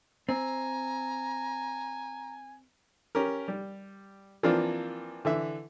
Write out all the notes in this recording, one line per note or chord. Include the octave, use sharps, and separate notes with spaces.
C4 G#5 A#5
C#4 G4 A#4
G3
E3 F3 A#3 C4 D4 F4
D3 E3 E5